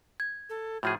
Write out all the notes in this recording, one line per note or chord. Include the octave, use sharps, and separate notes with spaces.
G#6
A4
A2 F3 F#4 G#4